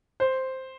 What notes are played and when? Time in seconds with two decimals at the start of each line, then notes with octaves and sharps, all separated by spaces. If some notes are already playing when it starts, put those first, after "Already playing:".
0.20 C5